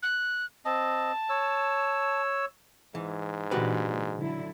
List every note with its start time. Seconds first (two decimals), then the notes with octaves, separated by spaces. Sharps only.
0.03 F#6
0.65 C4 D#5 A5
1.29 C#5 E6
2.95 G#2 E3
3.51 A#2 D3 E3 F#4 G4 B4
4.19 D3 F#3 E4